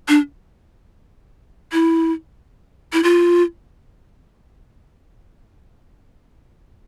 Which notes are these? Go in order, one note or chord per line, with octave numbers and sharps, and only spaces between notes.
D4
E4
E4
F4